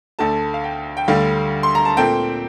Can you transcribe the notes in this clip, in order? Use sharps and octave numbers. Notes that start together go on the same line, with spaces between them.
D2 D3 A3 A5
F5
G5
G5
D2 D3 G3 F5
C6
A#5
A5
A#2 A3 C4 G5